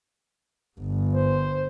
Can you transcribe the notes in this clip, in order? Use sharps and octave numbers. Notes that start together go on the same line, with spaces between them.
G1
C5